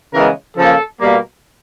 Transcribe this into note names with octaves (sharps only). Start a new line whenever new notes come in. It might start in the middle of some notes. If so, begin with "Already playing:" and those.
C#3 E3 G#3 B3 A#4
C#3 F3 A#3 A4
B2 G3 A#3